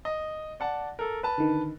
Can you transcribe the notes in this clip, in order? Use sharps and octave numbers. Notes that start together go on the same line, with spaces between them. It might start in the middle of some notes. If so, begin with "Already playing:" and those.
D#5
D5 F#5 A5
A4 A#4
B4 A5
D3 D#3